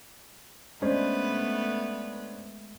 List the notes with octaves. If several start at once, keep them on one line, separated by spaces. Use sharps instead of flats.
G#3 A3 B3 C#4 D4 B4 C5